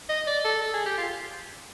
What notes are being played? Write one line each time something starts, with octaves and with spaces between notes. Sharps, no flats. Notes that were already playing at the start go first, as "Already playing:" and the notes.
D#5
D5
A4
A4
G#4
G4
F4